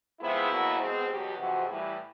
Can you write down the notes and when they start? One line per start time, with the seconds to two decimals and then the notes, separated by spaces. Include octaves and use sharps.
0.20 C3 F3 G#3 B3 E4
0.49 E2 B2 F#3 A#3
0.79 B2 G#3 C4
1.08 E2 B2 F#3 G4
1.39 F2 C3 E3 G#3 F#4
1.68 A2 E3 G3 E4